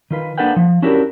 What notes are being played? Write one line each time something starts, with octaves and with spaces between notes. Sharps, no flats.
D#3 F4 B4
A#3 D4 A4 B4 F#5 G5
F3
C#4 D4 E4 F#4 G4 A#4